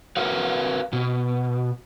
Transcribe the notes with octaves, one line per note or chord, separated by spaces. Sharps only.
F#4 A#4 B4 F5 F#5
B2